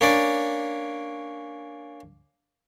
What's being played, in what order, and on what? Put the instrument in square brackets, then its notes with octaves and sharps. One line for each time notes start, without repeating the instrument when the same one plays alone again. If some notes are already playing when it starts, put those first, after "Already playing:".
[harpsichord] A#3 C#4 D4 D5